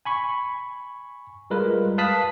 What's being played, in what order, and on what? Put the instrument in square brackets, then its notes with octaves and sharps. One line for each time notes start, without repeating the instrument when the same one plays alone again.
[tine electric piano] G#5 B5 C#6
G3 G#3 F4 A#4 B4
B4 F5 A5 D#6 F#6 B6